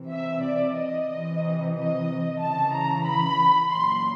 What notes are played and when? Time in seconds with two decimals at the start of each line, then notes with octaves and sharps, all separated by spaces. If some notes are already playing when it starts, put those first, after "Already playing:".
Already playing: C3 E3
0.11 E5
0.43 D5
0.77 D#5
1.10 C3 E3
1.75 D#5
2.40 C#3 E3 A5
2.73 A#5
3.06 B5
3.72 A#2 F#3 C6